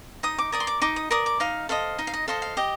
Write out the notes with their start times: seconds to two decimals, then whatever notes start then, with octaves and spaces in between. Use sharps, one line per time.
0.23 D#4 D#6
0.38 D6
0.52 A#4 D5 D#6
0.60 C6
0.67 D6
0.82 D#4 D6
0.96 D#6
1.11 A#4 D5 D#6
1.26 D6
1.40 D#4 F5
1.69 A4 C5 D#5 F5
1.98 D#4
2.07 F5
2.14 D#5
2.28 A4 C5 D#5 F5
2.42 F5
2.57 G4 D#5